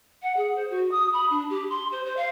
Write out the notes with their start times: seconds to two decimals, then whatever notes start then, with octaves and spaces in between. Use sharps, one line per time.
0.22 F#5
0.36 G#4
0.55 C5
0.70 F#4
0.91 D#6
1.13 B5
1.30 D4
1.49 G4
1.69 C6
1.91 C5
2.05 C5
2.16 F5